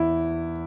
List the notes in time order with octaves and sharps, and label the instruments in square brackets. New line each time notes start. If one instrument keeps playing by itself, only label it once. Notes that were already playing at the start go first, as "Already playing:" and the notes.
Already playing: [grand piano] E2 E4